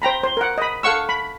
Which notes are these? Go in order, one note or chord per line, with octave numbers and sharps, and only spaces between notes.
C5 G5 A#5 B5
C5
A#4 F#5
D#5 B5
A4 F5 F#5 C#6 E6
B5